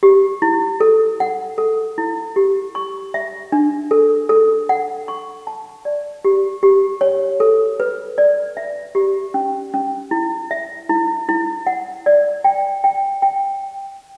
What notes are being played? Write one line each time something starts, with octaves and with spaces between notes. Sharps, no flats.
G4
E4
A4
F#5
A4
E4
G4
C#6
E5
D4
A4
A4
F#5
C#6
A5
D5
G4
G4
C#5
A4
B4
D5
E5
G4
C#4
C#4
E4
E5
E4
E4
F#5
D5
G5
G5
G5